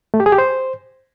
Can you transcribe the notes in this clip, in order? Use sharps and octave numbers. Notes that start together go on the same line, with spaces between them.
A3
G4
G#4
G4
C5